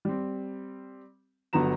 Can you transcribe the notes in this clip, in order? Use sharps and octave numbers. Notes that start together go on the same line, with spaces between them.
G3 C4
G1 D3 F#3 B3 A#5 E7